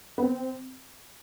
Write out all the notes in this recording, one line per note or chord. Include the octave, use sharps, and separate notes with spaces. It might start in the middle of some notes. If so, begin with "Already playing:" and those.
B3
C4